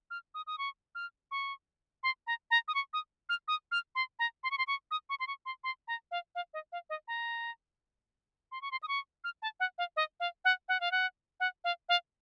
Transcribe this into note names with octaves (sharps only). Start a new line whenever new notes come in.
F6
D#6
D#6
C#6
F6
C#6
C6
A#5
A#5
D#6
C#6
D#6
F6
D#6
F6
C6
A#5
C6
C#6
C6
C#6
D#6
C#6
C6
C#6
C6
C6
A#5
F5
F5
D#5
F5
D#5
A#5
C6
C#6
C6
D#6
C#6
F6
A5
F#5
F5
D#5
F5
F#5
F#5
F5
F#5
F#5
F5
F5